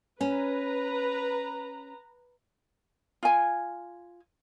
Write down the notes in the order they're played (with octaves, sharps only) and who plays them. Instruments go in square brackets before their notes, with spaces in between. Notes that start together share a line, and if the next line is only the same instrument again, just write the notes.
[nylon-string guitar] C#4 [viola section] B4 A#5
[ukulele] F4 G#5